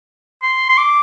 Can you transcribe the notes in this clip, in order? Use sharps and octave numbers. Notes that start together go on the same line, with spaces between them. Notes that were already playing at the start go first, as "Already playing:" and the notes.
C6
C6
D6